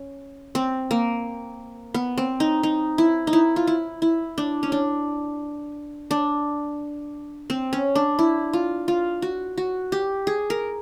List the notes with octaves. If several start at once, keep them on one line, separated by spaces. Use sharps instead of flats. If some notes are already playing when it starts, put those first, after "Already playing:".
Already playing: C#4
C4
A#3
B3
C4
D#4
D#4
E4
D#4
E4
F4
E4
E4
D4
C#4
D4
D4
C4
C#4
D4
E4
F4
F4
F#4
F#4
G4
G#4
A#4